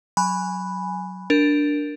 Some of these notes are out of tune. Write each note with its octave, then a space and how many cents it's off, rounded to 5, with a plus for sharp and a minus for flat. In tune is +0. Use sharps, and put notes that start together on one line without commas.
F#3 +0 G#5 +0 B5 +0
D4 +0 A#4 +0